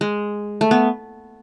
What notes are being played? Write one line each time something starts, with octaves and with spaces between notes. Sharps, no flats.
G#3
A3
B3